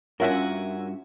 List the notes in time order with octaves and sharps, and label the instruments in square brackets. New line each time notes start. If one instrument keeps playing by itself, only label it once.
[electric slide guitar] G2 F#4 [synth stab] C#4 F4 E5 [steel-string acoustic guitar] A#4 F#5 G#5